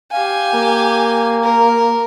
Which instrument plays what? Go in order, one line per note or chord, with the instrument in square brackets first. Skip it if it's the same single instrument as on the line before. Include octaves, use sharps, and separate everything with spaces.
[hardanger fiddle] G4 G#5 [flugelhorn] F5
[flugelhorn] A#3
[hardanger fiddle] A#4